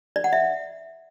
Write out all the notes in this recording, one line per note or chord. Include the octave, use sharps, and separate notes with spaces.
D5
F#5
E5